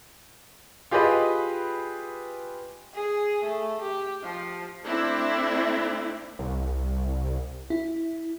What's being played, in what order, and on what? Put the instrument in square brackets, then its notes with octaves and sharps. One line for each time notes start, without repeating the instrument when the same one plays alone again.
[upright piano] F4 G4 G#4 B4 D#5
[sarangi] G#4
A3
G4
F3
[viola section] A3 C4 D4 E4
[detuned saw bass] C2
[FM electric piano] E4